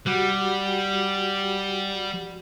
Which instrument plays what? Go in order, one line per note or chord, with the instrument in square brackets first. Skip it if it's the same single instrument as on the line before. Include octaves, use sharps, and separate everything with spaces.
[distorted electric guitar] G3 [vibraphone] F#4 G4 F#5